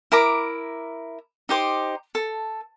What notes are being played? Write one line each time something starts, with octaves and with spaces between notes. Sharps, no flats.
E4 A#4 A#5 D6
D#4 G4 C5 D6
A4